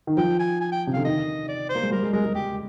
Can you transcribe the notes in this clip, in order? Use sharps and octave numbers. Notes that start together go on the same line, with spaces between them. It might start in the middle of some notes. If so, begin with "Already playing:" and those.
D#3
F3 G5
G#5
G#5
G5
C3
D3 F5
D#3 D#5
D5
C5
A#3
G#3
G3 A#4
G#3
G#3 A#4
G#3
G4